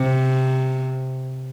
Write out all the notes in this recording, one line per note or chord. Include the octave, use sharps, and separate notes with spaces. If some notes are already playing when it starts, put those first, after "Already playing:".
Already playing: C3